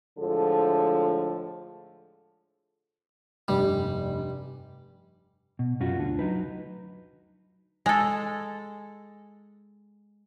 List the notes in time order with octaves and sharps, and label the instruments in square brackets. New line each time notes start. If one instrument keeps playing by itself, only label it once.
[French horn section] A2 D3 F3 G#3 A4
[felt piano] F1 G2 [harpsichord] G3
[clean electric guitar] B2
F#2 C#4 F4 F#4
D2 D3
F#3 D#4 B4
[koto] G#3 A4